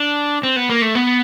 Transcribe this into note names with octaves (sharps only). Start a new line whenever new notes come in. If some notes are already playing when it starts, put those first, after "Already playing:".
Already playing: D4
C4
B3
A#3
A3
B3